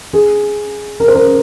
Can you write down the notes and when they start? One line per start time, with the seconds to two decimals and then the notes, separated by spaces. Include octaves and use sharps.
0.13 G#4
1.00 A#4
1.08 C5
1.15 A#4